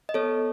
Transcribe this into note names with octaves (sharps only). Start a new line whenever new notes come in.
D#5
B3 A4 C#5